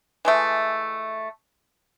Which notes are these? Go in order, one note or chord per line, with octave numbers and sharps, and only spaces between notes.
E3 G#3 A3